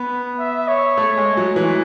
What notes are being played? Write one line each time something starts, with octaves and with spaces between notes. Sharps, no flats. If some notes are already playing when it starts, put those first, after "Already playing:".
Already playing: B3 B4
E5
C#5
A3
G#3
F#3
E3